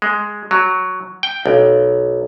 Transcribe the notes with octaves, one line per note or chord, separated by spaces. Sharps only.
G#3
F#3
G5
B1